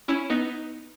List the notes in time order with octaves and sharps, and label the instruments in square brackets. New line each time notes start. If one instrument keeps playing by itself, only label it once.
[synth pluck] C#4 E4
B3 D#4